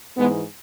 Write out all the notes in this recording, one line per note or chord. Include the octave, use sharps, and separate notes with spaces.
G#2 E3 G#3 B3